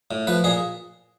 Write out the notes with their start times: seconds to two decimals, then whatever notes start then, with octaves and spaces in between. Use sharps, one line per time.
0.11 A2
0.27 F3 B4
0.44 A#2 G#4